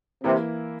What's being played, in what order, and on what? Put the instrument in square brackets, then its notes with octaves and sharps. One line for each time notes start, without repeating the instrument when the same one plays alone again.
[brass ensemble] C3 [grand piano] E3 A#3 E4